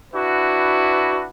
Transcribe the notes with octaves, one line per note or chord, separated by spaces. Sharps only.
D4 E4 F#4 B4